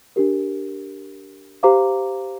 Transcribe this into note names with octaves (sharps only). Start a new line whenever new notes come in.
D4 G4 A#4
G4 C5 F5 A#5 D6